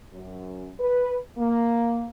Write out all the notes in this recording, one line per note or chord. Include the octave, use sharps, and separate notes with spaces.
F#2
B4
A#3